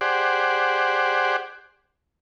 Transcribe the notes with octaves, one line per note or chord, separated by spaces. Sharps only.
G4 G#4 C5 D5 F#5